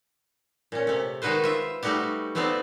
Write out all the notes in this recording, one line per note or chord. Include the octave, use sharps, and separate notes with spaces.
A#2 C#4
C3 A3
D#3 G#3 D#4 F#4 B4 C5
F4 E5
G3 A3 D#4 F#4 G4
F3 A3 B3 C4 D#4 D5